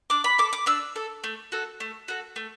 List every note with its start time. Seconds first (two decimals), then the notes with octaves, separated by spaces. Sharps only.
0.10 D4 D6
0.24 B5
0.38 A4 D6
0.53 D6
0.66 D4 E6
0.96 A4
1.24 A3
1.52 F#4 A4
1.80 A3
2.08 F#4 A4
2.36 A3